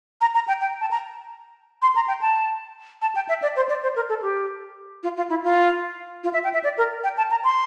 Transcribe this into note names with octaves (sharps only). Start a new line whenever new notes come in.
A#5
A#5
G5
G5
A5
A#5
C6
A#5
G5
A5
A5
G5
E5
D5
C5
D5
C5
A#4
A4
G4
F4
F4
E4
F4
F4
E5
G5
E5
D5
A#4
G5
A5
A#5
C6